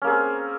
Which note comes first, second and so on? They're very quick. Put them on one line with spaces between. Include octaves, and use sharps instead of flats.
C#4 A#3 G#4 C4